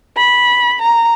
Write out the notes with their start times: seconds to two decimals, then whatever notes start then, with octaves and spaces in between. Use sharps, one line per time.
0.17 B5
0.82 A#5